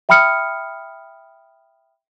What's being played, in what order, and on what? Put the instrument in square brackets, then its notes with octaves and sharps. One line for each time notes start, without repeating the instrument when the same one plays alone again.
[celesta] E5 G5 B5 D#6 F6 C#7